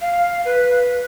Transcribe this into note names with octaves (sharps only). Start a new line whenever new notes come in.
F5
B4